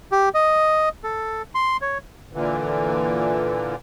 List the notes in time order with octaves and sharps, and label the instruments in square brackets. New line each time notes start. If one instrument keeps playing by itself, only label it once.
[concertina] G4
D#5
A4
C6
C#5
[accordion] A#2 D3 E3